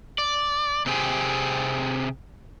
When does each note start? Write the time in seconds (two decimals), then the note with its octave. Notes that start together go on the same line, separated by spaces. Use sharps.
0.18 D5
0.86 C3 C4 G4 G#4